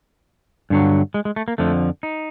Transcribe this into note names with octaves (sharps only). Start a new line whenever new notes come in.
G2 D3 F#3
G#3
G#3
A3
A#3
F2 D3 F3 A3
D#4